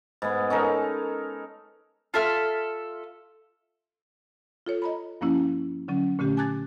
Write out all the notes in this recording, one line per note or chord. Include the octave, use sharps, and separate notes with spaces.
G#2 B3
C#4 D#4 A4 A#4
F4 A4 E5 F6
F4 A4 C#5
D#5 A#5 B5
G2 F3 A#3 C#4 E4
D3 F#3 C#4
A#2 D3 A3 C#4 G4
G#5 A5 D6 F#6 G#6 A6